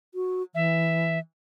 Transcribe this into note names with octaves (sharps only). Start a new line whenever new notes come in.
F#4
E3 E5